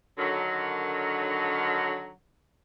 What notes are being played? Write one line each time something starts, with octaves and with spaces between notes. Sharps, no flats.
D3 D#3 F#3